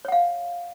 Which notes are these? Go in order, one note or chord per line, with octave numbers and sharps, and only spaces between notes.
C#5 F5 F#5